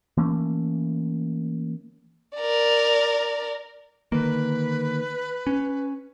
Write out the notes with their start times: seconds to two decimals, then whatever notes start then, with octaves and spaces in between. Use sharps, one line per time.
0.17 E3 A3 A#3 C#4
2.36 A#4 D5
4.12 D3 D#3 A#3 B4
5.47 C#4